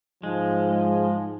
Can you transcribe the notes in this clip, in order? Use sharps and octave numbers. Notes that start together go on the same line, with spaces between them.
G#2 F3 G#3